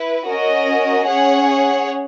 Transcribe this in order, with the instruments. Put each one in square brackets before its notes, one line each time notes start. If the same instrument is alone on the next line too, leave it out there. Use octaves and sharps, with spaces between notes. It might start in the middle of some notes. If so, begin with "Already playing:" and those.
Already playing: [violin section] E4 B4
C#4 F#4 A#4 D#5
C#4 G#4 C#5 F#5